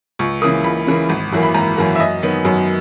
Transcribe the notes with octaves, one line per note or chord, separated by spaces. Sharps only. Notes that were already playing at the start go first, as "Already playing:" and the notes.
C#2 C#6
C#3 E3 A#3 D#6
C#2 B5
C#3 E3 A#3
G#1
F#2 E3 A#3
B5
G#1 A#5
F#2 E3 A#3
E5
F#2 D#5
D#3 F#3 B3
F#2